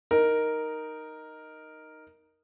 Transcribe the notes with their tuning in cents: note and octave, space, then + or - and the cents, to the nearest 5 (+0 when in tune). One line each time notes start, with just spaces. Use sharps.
D#4 +0 A#4 +0